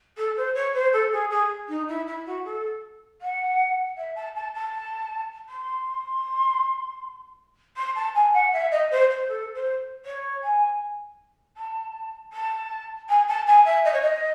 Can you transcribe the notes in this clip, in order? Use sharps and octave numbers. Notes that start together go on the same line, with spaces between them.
A4
C5
C#5
C5
A4
G#4
G#4
D#4
E4
E4
F#4
A4
F#5
E5
A5
A5
A5
C6
C6
A5
G#5
F#5
E5
D#5
C5
C5
A4
C5
C#5
G#5
A5
A5
G#5
A5
G#5
E5
D#5
C#5
D#5